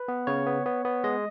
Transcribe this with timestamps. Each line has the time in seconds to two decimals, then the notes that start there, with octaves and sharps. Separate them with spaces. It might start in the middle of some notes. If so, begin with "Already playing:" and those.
Already playing: B4
0.08 B3
0.27 C#3 C#5
0.46 B3
0.66 B3
0.85 B3
1.04 G#3 D#5